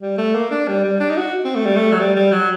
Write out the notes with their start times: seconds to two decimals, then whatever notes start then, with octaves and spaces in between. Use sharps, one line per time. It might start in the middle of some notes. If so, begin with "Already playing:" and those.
0.02 G3
0.18 A3
0.35 A#3
0.51 D4
0.68 G3
0.84 G3
1.00 D4
1.10 D#4
1.17 F#4
1.45 C4
1.56 A3
1.65 G3
1.76 A3
1.92 F#3
2.00 G3
2.16 G3
2.32 F#3